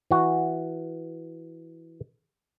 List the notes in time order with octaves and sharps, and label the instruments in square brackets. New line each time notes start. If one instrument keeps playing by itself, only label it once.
[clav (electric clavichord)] E3 F#4